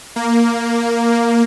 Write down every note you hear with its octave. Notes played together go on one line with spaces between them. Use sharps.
A#3